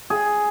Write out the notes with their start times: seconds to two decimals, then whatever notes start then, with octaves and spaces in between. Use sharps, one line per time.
0.10 G#4